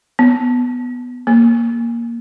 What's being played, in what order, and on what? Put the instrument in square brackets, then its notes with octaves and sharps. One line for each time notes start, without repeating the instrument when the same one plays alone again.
[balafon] B3
A#3